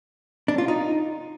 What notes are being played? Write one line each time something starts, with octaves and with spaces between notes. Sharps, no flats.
D4
F4
D#4